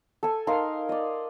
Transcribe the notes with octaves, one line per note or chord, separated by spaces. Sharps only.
A4 G#5
D#4 A#4 F5 C6
D5 D#5